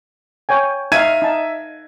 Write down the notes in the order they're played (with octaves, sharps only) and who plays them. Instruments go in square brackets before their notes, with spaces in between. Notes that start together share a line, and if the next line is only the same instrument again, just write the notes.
[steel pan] C#5 G5 G#5
[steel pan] D#4 F5 [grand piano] E5 G#6 D#7
[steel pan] D#4 A5